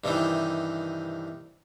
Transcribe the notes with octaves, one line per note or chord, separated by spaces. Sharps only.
G2 C3 D#3 E3